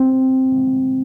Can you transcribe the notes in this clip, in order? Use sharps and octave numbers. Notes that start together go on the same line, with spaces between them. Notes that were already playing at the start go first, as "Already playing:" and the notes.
Already playing: C4